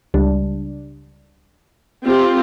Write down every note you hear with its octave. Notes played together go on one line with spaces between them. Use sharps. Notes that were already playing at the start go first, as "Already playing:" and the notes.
C#2 G3 D4
C4 F4 G4